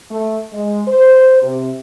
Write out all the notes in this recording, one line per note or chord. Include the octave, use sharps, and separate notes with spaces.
A3
G#3
C5
C3